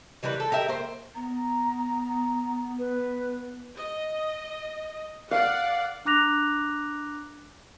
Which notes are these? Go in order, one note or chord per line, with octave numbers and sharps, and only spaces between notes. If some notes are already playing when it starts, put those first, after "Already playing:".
E3 G3 A#4 B4
A4
G4 A#4 E5
A#3 C5
B3 A#5
B4
D#5
D5 F5 F#5
D4 A#5 D6 F#6 A#6 F7